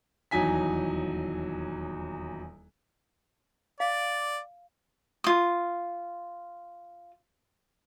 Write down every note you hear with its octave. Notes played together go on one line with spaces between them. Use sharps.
D#1 E2 F#3 D#4 G#5 B6
D5 F5
F4 D#6